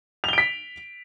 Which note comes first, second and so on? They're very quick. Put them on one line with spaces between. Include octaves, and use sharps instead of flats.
F7 G7 D7 B6